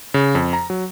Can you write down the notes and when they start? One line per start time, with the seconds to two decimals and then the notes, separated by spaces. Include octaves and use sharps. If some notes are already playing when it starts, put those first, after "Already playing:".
0.14 C#3
0.35 F2
0.53 A#5
0.70 F#3